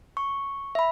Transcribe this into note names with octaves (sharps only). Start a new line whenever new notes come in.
C#6
E5 B5